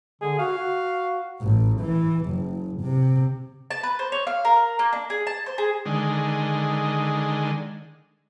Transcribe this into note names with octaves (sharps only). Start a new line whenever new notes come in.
D3 G#4
F#4 F5
F#4
A1
E3
F#1
C3
A5
B4
C5
C#5
F5
A#4
A#3
D4
G#4
A5
C5
G#4
D3 D#3 G#3